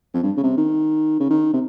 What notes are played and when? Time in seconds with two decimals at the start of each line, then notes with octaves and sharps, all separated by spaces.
0.14 F2
0.23 G2
0.37 C#3
0.43 C3
0.57 D#3
1.20 C#3
1.30 D#3
1.53 C3